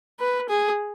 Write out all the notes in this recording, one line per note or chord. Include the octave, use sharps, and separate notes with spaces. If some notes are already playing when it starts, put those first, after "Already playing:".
B4
G#4